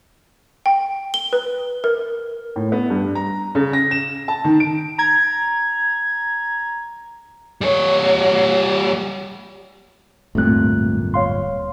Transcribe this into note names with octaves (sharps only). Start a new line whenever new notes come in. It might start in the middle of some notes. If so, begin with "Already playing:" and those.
G5
G7
B4
A#4
A2
B3
G2
A#5
C#3
A#6
E7
A5
D#3
D7
A#5 G#6
G3 C#5
D1 G2 A#2 A3 C4 F#6
C#5 F5 C6